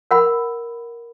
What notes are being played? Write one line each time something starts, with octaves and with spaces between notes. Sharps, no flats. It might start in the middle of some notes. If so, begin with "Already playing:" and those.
A#4 F#5 B5